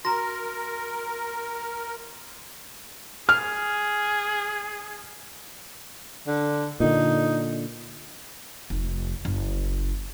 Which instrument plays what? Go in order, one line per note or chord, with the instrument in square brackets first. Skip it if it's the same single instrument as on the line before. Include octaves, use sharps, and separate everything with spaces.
[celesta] F#4 A#5 [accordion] A#4 [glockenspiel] C6 A#6
[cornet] G#4 [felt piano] F6
[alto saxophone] D3
[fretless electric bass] A#2 D3 [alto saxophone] D#4
[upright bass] F1
F#1